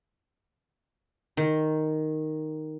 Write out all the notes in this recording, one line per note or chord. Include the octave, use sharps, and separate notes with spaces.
D#3